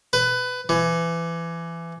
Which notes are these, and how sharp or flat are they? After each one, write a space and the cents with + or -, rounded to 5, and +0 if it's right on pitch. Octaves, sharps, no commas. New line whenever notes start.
B4 +20
E3 +25